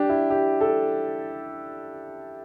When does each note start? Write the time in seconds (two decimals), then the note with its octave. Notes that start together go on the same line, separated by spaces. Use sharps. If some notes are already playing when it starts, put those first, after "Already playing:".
Already playing: D4 G4
0.09 E4
0.30 G4
0.61 A4